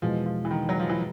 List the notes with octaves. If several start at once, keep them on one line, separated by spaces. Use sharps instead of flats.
E2 B2 F3 G#3
F3
E3
D#3
F#3
F3
E3